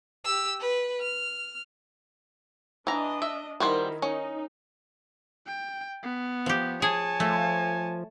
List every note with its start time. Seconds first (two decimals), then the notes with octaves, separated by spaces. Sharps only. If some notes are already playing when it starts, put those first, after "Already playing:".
0.25 G4 E6
0.60 B4
1.01 F6
2.87 E3 D4 D#5 A#5
3.22 E5
3.60 D#3 G3 E4 F#4 C5
4.02 C#4 D#4
5.47 G5
6.03 B3
6.46 F3 G4
6.82 G#4 C#5 G#5 A5
7.20 F3 A3